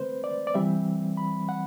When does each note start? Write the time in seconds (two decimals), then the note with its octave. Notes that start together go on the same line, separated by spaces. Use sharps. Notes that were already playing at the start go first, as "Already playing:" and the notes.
Already playing: D3 A3 C4 B4 C5
0.24 D5
0.47 D5
0.54 E3 G3 C4 E5
1.17 B5
1.49 F#5